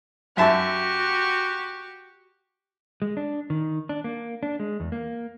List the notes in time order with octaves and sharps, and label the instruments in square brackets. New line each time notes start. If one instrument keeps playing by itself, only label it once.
[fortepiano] F#2 E5 A5 [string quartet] F#4 G4 C#6
[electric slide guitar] G#3
D4
D#3
D4
A#3
D4
G#3
E2
A#3